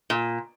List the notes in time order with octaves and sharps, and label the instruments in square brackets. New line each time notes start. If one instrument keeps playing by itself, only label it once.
[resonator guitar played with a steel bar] A#2